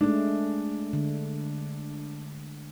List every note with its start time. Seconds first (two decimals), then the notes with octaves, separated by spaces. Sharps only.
0.01 G#3 A3 D4
0.93 D3